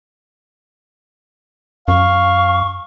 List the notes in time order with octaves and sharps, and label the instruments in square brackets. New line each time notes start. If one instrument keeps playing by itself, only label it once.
[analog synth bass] F#2 [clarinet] F5 [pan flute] C#6